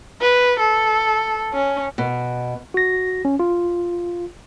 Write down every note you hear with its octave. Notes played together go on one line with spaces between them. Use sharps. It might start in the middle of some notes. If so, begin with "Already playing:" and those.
B4
A4
C#4
B2
F#4 A#6
C#4
F4